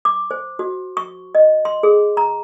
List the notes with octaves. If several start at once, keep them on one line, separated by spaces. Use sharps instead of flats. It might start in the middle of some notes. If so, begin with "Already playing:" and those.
D6
C5
F#4
C#6
D#5
C6
G#4
A#5